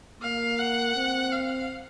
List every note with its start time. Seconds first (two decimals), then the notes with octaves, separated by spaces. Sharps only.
0.22 A#3 F5
0.58 F#5
0.96 C4
1.32 F5